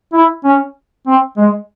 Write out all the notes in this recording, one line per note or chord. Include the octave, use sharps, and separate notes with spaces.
E4
C#4
C4
G#3